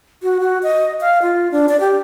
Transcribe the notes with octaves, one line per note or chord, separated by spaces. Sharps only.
F#4
F#4
D#5
F5
F4
D4
D5
G4